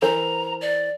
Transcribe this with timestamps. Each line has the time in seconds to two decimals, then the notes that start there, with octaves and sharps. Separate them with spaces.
0.02 E3 A#4 C5 A#5
0.61 D5